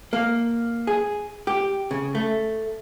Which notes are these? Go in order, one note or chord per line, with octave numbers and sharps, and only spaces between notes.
A#3
G#4
G4
C#3
A3